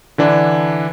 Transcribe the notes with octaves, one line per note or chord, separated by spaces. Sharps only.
D3 E3 D4